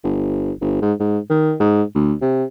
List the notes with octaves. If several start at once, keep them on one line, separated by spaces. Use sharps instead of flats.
G1
G1
G#2
G#2
D#3
G#2
D2
C3